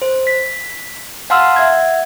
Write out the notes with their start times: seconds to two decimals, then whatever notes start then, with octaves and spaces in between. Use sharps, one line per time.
0.02 C5
0.27 B6
1.30 F5 F#5 A5 C6 E6 F6
1.56 E5 F#5 G#6